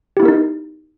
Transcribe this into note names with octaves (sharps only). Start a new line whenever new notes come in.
B3 D#4 E4 G4 A#4